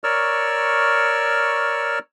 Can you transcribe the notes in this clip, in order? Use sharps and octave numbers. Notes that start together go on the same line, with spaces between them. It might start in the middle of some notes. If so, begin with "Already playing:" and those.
A#4 C#5 D5 C#6 E6 F6